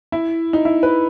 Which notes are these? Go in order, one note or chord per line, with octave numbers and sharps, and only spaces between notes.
E4
D#4
E4
B4